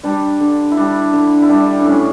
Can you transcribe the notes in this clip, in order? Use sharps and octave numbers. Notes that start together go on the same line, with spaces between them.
G3 D4
D3
E4
G3 D4
D3
E4
G3 D4
D4
A2 C#4